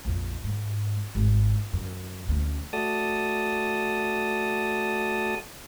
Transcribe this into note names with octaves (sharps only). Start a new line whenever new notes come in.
A#1 F2
G#2
G#1
F#2
D2 C#4
A3 F#4 A4 D5 A5 D#6